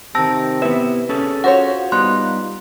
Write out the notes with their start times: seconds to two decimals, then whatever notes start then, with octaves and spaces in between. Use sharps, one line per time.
0.15 C3 D#3 C4 A5 E6 A#6
0.62 B3 E4 B4 E5
1.09 C#4 G#4 A4
1.44 F4 F#4 C5 C#5 F#5
1.92 G3 B3 D#4 C6 F#6